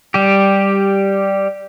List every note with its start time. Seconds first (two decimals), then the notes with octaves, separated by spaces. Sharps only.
0.14 G3 G4